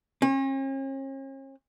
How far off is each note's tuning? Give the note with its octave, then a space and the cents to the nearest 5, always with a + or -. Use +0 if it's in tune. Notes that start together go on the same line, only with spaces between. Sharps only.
C#4 -45